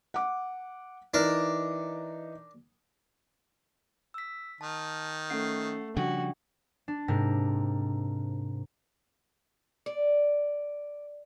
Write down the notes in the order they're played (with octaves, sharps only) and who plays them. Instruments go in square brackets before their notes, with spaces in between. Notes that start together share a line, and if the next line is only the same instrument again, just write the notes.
[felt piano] F#5 D6
[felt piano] E3 D#4 [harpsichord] D4 A#4
[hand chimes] E6 B6
[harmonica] D#3 [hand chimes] A5 F6
[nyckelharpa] A3 [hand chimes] C#4 F#5 C7
[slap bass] C#3 F3 G3 [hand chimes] D4 G5 [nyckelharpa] F#4
[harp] D4
G#2 C3 A#4
[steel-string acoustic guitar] D5